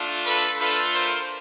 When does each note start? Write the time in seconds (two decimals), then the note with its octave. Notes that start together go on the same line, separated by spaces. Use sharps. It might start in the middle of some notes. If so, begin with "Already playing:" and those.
Already playing: A3 D4 F4
0.25 A4 B4
0.59 A3 D4 F4 A4 B4
0.93 A#4 C5